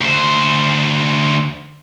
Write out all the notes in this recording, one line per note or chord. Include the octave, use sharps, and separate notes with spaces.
D2 C5